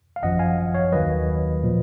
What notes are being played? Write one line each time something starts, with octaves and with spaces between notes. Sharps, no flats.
F5
G#1 F#2 F3 D#5 F#5
F5 G#5
C#5 F5
D#2 D#3 F#3 B4 D#5
A#2 F3